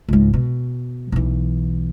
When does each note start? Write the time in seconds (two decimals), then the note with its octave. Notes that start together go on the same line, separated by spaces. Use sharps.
0.08 C#2 G#2
0.33 B2
1.12 B1 E3